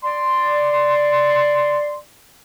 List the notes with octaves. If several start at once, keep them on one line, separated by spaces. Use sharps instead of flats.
D5 C6